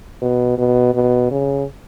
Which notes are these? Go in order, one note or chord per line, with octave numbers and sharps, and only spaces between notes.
B2
B2
B2
C#3